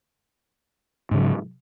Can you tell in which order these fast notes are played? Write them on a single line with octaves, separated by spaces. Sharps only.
G#2 C#3 F#3